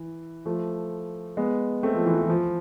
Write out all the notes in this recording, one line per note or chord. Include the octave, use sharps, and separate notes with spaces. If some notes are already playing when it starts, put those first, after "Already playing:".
Already playing: E3
F3 A3
G#3 B3
A3 C4
F3
E3
E3
F3